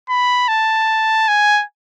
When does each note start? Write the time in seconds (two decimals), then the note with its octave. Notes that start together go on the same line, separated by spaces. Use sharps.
0.09 B5
0.48 A5
1.28 G#5